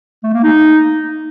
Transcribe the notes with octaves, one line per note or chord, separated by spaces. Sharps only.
A3
A#3
D#4